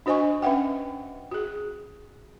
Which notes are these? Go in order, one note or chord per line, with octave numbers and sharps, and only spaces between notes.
D4 F#4 C5 D#5 G#5 C#6
C#4 B4 E5 F#5 G5
F#4 G#4